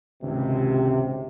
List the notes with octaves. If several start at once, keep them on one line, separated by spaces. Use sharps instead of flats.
G#1 C#2 C3